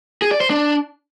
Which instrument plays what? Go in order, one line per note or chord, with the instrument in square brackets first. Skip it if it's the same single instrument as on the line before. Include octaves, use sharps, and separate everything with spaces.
[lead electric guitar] G#4
D5
C5
D4